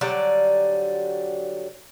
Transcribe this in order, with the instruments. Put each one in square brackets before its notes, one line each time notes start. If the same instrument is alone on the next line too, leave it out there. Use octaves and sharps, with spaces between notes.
[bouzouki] D3 F#3 G3 D5